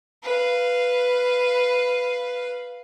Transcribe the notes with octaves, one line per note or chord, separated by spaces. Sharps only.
B4 F5